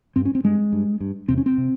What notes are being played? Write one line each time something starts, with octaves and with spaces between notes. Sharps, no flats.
G2 C4
C#4
C4
G2 G#3
G2
G2
E2 C3 C4
C#4
C4
C3